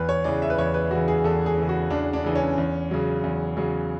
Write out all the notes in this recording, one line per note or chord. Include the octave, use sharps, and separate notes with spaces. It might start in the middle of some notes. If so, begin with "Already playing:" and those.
Already playing: E2 B4
C#5
C#3 E3 D5
E5
B4
E2 C#5
B4
C#3 E3 F#4
G#4
E2 A4
G#4
C#3 E3
F#4
E2 D4
D4
C#3 E3
C#4
E2
C#3 F#3
E2
C#3 F#3